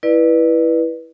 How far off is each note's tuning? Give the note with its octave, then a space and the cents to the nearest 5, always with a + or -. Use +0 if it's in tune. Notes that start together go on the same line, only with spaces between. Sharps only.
E4 +0 B4 -20 D5 +30